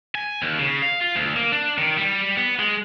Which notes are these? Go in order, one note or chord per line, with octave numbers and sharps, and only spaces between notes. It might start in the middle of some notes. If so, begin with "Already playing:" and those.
G#5
D#2
C#3
F5
F4
D2
A#3
D4
D#3
G3
B3
G#3